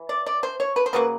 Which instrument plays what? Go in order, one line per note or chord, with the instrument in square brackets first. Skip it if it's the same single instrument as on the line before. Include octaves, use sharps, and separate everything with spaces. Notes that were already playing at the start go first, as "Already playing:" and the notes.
Already playing: [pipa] E3
D5
D5
C5
C#5
B4
C5
C#3 F#3 A#3 B4